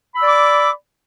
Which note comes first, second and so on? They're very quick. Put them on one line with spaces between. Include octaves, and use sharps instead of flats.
B5 E6 D5 D6